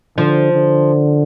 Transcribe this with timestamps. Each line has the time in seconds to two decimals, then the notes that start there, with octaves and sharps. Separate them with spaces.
0.17 D3 F3
0.53 D3